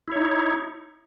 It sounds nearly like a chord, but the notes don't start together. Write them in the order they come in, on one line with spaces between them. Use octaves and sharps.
E4 C#5 D#4